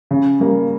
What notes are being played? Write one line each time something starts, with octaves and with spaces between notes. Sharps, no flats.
C#3
G3 A#3